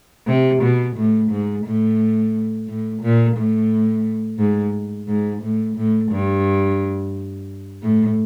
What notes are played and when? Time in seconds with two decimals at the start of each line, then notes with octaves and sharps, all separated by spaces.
0.27 C3
0.62 B2
0.96 A2
1.31 G#2
1.65 A2
2.68 A2
3.02 A#2
3.37 A2
4.39 G#2
5.08 G#2
5.42 A2
5.77 A2
6.12 G2
7.83 A2